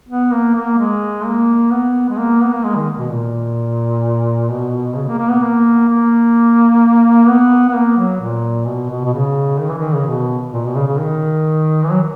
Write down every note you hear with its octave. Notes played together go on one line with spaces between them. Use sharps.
B3
A#3
A#3
G#3
A#3
B3
G#3
A#3
B3
A#3
G#3
D#3
B2
A#2
B2
C#3
A#3
A#3
B3
A#3
A#3
B3
B3
A#3
F#3
A#2
B2
B2
B2
C#3
D#3
E3
D#3
C#3
B2
A#2
B2
C#3
C#3
D#3
E3
F#3